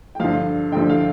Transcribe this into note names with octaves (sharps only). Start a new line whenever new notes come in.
G5
G2 D3 F3 F5
G2 D3 F3 G5
F5